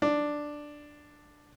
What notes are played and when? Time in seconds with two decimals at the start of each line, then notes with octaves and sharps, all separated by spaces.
0.02 D4